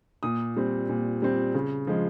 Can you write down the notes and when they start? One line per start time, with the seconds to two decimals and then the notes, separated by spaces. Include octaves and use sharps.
0.23 A#2 D#6
0.57 G3 C4
0.89 A#2
1.22 G3 C4
1.54 C#3
1.87 F3 G#3